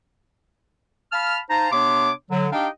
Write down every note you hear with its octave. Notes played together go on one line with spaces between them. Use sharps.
F5 A5 B5 F6
D#4 C5 F5 A5 A#5
C3 B3 D4 C#5 C6 D6
D3 F#3
D4 D#4 G4 D#5 F5 G5